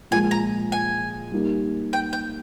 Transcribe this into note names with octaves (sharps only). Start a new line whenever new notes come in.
A#2 F3 G#3 G#5
A#5
G#5
G3 A#3 D#4
G5
G5